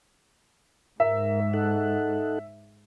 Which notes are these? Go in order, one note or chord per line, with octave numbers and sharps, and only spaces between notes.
G#2 A#4 E5
D#4 A4 F#5